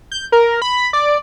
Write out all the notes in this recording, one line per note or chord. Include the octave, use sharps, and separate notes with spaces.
G6
A#4
B5
D5